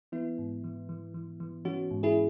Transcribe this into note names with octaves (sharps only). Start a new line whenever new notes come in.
E3 B3 E4
G#2
E3
E3
E3
E3
E3 C#4 F#4
G#2
E4 G#4